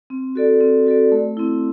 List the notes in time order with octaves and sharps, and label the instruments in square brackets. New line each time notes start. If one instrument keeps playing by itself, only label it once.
[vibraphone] C4
F#4 A4 D5
C4
F#4 A4 D5
A3
C4 E4